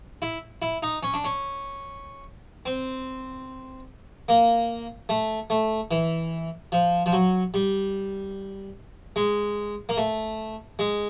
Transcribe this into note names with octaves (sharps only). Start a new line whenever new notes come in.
E4
E4
D#4
C#4
D4
C#4
C4
A#3
A3
A3
E3
F3
F3
F#3
G3
G#3
A#3
A3
G#3